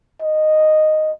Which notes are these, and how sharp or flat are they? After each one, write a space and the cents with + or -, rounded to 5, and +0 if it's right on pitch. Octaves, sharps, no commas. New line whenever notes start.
D#5 -5